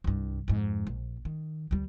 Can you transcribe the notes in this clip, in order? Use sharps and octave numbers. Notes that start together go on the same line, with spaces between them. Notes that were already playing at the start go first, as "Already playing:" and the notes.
C2 G2
F2 G#2
A#1
D#3
D2 G3